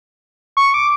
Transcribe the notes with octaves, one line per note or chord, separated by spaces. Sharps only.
C#6
D6